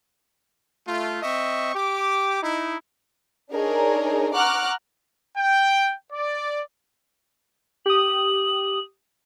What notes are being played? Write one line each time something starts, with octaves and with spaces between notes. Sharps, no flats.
A3 F4
C4 D#5 E5 C#6
G4 D6
D#4 E4
D4 D#4 G#4 A#4 C#5
F#5 A#5 C#6 D6 F6 F#6
G5
D5
G4 D#6 F#7